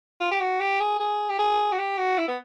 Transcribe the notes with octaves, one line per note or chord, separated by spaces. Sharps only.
F4
G4
F#4
G4
G#4
G#4
G4
G#4
F#4
G4
F#4
E4
B3